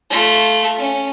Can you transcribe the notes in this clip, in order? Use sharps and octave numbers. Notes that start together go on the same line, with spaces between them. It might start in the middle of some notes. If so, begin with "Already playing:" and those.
A3 F4
C#4